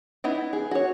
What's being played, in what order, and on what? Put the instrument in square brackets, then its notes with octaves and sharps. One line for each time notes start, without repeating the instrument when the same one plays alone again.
[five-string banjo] B3 D#4 E4
G#4
F#4 C#5